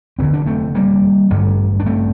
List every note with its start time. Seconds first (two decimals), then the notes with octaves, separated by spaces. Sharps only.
0.19 F1 D#2 D3 C4
0.33 D4
0.46 A3 C4
0.75 G3 A#3
1.30 A1 G2 D3
1.80 D4
1.86 A3 C4